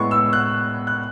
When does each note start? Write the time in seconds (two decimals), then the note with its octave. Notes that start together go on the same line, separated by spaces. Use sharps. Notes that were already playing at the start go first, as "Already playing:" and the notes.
Already playing: A2 G#3 B3 C#6
0.11 E6
0.33 F#6
0.87 F#6